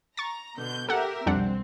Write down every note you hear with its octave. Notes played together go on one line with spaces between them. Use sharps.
A#5 C#6 A6
B2 D3 G6
G4 A4 A#4 E5 F#5
B1 F2 G3 C4 D4 F#5